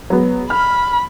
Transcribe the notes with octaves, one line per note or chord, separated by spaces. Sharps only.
F#3 G#3 B3
B5 F6